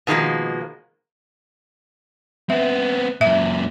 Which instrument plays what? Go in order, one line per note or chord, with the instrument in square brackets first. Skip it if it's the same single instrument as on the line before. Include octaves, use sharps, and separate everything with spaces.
[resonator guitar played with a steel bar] B2 D#3 F3 G#3 A#3
[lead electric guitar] B3 C4 [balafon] E5
[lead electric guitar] F#2 A#2 [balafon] E5